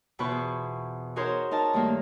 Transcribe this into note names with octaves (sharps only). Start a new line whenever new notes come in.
E2 B2 F4 B4 C5 C#6
G#4
D#4 F#4 G#4 A#4 C5 C#5
D#4 A#4 D#5 A5
G2 D#3 A3 A#3 A#4